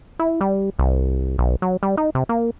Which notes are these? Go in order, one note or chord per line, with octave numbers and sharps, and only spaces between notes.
E4
G3
C2
B1
F#3
G3
D#4
C3
A#3